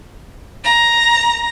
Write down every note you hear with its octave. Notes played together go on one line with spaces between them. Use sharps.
A#5